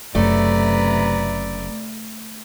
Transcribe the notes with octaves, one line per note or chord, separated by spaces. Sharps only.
F#1 F#2 C3 A3 B4 D5 A#5